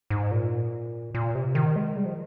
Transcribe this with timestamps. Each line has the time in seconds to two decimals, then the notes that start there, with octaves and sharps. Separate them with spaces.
0.10 G#2
0.31 A#2
1.15 A#2
1.35 C3
1.55 D#3
1.76 G#3
1.96 G3
2.05 F3